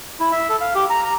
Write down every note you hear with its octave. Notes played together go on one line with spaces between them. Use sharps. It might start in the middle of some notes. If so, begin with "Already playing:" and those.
E4
E5
A4
F5
G4
A#5
A#5